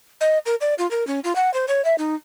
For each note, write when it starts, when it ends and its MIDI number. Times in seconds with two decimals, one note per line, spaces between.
0.21 0.39 75
0.46 0.55 70
0.61 0.74 74
0.78 0.89 65
0.91 1.07 70
1.07 1.20 61
1.24 1.35 65
1.36 1.53 78
1.54 1.66 72
1.68 1.84 73
1.85 1.96 76
1.98 2.15 63